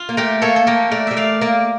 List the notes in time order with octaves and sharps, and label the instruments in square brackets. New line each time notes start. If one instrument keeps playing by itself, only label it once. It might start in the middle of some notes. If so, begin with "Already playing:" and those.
Already playing: [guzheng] F4
[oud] A#3
[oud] A3 [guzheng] G4 A#4
[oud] A#3 [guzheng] A4 C#5
[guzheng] A4
[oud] A#3 [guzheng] G4 A#4
[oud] A3 [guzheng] A#4 D5
[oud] G3 [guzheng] E5
[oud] A3 [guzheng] D5 F5
[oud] A#3 [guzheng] A#4 D5